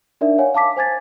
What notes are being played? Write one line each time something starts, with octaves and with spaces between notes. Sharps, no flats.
D4 D#4 A#4 D5 E5
C#5 F5 F#5 G#5
F5 A5 D6 B6
C5 G#5 G#6 A6